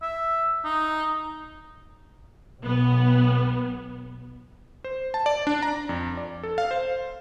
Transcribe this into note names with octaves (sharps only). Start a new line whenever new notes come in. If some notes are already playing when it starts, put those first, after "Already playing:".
E5
D#4
B1 B3
C5
A5
D5
D4
A#5
F2
D5
A4
F5
C5